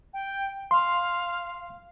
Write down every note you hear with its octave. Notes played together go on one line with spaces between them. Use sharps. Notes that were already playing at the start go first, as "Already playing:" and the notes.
G5
F5 C6